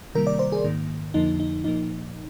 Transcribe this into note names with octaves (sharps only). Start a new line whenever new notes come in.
C3 D#3 G3 A#3 A#4
D5
C5
G#4
G#2 D#3 A#3
F2 D3 F3 A#3 D#4
D#4
A#2 F3 A#3 D#4